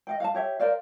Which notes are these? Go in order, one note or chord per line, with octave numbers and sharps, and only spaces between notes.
D#5 F5 G5
F5 F#5 A5
G4 C#5 E5
A#4 C5 D5 F5